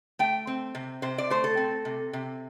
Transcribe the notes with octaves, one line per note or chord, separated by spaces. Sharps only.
A3 G5
C4
C3
C3 C5
D5
A3 C5
A4
C4
C3
C3